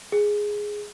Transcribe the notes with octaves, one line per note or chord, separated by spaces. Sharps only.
G#4